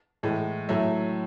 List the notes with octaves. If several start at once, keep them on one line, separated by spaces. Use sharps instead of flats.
A2 E3 G#3
A2 F#3 A3 E5